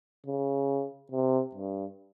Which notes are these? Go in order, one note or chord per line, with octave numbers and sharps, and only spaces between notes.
C#3
C3
G2